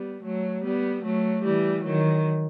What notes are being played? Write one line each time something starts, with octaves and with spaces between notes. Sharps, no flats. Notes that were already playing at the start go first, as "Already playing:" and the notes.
Already playing: G3 B3
F#3 A3
G3 B3
F#3 A3
E3 G3
D#3 F#3